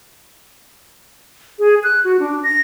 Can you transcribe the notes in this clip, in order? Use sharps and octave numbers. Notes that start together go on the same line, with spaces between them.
G#4
F#6
F#4
D4
A#6